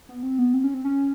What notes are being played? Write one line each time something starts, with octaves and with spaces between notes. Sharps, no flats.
B3
C4
B3
C4
C#4
C4
C#4